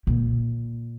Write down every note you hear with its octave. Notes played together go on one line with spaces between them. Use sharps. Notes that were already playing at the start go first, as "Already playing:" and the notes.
A#2